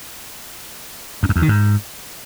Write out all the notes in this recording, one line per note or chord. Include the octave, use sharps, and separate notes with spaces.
F2
F#2
E2
D#3
G#2